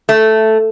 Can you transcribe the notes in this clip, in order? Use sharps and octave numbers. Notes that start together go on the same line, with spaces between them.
A3